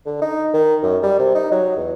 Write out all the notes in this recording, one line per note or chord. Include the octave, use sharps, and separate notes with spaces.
D3
D#4
D#3
F#2
G3
C3
D#4
F#3
E2